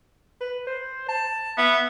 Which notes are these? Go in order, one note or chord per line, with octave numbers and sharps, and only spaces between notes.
B4
C5
A5
B3 E5